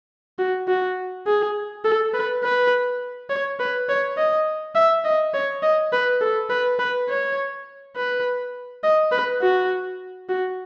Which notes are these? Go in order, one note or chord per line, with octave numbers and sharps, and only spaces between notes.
F#4
F#4
G#4
A4
B4
B4
C#5
B4
C#5
D#5
E5
D#5
C#5
D#5
B4
A4
B4
B4
C#5
B4
D#5
B4
F#4
F#4